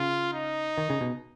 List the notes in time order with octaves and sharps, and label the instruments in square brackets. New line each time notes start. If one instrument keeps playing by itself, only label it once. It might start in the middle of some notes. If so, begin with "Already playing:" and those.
Already playing: [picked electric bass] C#3 [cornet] F4
[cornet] D#4
[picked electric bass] D#3
C#3
B2